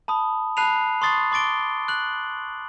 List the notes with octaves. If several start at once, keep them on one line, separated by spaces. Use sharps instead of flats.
A5 B5 D#6
A5 B5 F#6 C7 D#7 F7
C6 C#6 D#6 A6 C7
C6 D6 A6 D7 G7
F#6 F#7